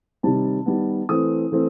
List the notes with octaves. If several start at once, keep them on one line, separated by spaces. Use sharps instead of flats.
C3 D#3 G3 C4 A5
D#3 G3 B3
E3 A3 C4 D#6
E3 A3 C4